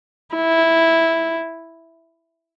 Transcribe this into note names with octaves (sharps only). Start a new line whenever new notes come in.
E4